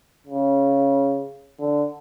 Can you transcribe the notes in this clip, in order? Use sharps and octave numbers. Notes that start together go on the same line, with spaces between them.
C#3
D3